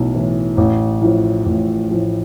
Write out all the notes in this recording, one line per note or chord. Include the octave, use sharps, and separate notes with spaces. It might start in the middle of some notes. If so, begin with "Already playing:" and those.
Already playing: B1 A2 E3
A2 E3
A1
A2 F3
A1
A2 F3